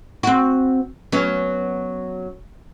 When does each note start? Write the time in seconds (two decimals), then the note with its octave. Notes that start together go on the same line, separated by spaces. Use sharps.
0.23 C4 F#4
1.12 F#3 B3 C#4